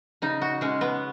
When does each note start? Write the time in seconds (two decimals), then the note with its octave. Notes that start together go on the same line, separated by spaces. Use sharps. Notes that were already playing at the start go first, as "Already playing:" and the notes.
0.22 C#3 D#4
0.41 F#4
0.61 G#3 C#4
0.81 B3